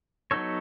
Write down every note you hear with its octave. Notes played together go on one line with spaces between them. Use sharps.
F#3 B3 D#4 A4 C#5